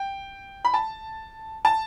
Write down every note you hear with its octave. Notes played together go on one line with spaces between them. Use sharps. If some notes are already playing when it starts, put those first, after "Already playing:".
Already playing: G5
B5
A5
A5